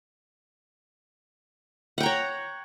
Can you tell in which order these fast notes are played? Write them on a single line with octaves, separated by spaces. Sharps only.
F#5 G5 A#5 C#5